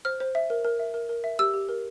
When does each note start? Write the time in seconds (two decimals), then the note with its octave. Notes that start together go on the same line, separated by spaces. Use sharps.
0.05 C5 F6
0.20 C5
0.35 E5
0.50 A#4
0.65 A#4
0.79 E5
0.94 A#4
1.09 A#4
1.24 E5
1.39 G4 E6
1.54 G4
1.69 A#4